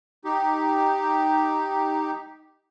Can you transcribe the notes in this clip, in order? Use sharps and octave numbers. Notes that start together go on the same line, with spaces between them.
D#4 G4